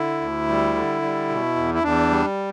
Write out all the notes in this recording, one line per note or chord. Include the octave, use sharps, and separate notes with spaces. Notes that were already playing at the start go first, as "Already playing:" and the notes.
Already playing: D3 E4
D2
G3
D3
G3
B2
E2
E4
E2 D4
G3